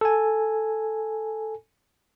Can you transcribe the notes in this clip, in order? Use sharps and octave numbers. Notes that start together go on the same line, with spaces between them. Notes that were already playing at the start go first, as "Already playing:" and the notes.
A4 G#5